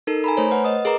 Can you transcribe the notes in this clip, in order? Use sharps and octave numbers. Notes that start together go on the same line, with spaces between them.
D#4 A4 A#4
G#5 A#5 B5
A3 C5 C#5
B4 F#5
D#5 D#6
G#4 A#4 B4 A#5 D6